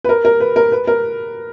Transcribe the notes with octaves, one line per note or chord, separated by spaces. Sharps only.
B4
A#4
A#4
B4
A#4
B4
A#4